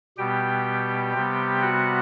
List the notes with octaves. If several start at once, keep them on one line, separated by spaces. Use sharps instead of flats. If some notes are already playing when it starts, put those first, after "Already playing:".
B2 G3 B3 G4 G5
C3 G3 B3
F#4 F#5